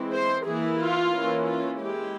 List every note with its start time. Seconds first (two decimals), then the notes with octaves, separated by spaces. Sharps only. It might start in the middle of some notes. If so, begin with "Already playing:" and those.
Already playing: E3 G#3 C4 E4
0.11 C5
0.45 E3 A#3 E4 G#4
0.78 F4
1.11 E3 A#3 C#4 E4
1.46 F4
1.78 G#3 E4 G4